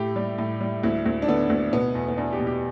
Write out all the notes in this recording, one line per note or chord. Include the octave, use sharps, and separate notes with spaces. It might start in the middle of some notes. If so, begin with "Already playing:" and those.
Already playing: A2 G4
G3
A2
G3
D2 E4
D2
D4
D3 B3
D2
B2 B3
E2
B3
E2 D4
G4
B2
G4